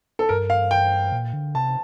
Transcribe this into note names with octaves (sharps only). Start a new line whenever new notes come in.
A4
G2 A#4
F5
G5
A#2
D3
C3 A5